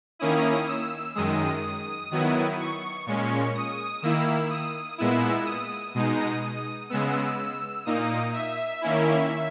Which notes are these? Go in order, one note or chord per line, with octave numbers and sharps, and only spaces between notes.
D#3 A#3 C#4 E4 D#6
E6
F#2 D#3 G#3 D#6
D#3 F#3 B3 E4
C#6
A#2 G#3 C#4
D#6
D#3 A#3 E4 E6
D#6
A#2 G#3 B3 E4 E6
D#6
B2 G#3 D#4
C#3 G#3 B3 E6
A#2 A#3 D#4 D#6
E5
D#3 A#3 C#4 E4